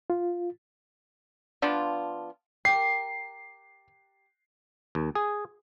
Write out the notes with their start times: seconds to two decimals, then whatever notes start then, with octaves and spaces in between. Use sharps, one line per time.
0.10 F4
1.62 F3 B3 D4 F4
2.65 G4 A#4 C7
4.95 D#2
5.15 G#4